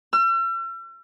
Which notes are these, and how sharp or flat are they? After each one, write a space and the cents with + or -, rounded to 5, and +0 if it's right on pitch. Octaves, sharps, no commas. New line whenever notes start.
E6 +45